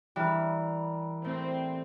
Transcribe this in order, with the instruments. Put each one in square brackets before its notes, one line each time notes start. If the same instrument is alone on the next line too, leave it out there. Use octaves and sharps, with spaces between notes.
[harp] E3 [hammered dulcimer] G3 A#4
[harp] A2 [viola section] C4